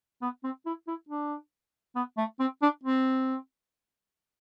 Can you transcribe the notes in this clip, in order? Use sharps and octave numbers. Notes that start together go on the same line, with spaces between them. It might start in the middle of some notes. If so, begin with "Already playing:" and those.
B3
C4
E4
E4
D4
B3
A3
C4
D4
C4